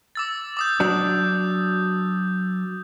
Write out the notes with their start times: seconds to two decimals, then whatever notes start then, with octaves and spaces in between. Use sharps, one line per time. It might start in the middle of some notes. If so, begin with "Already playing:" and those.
0.15 D6 E6 A6
0.57 D6 D#6 G6
0.80 F#3 D4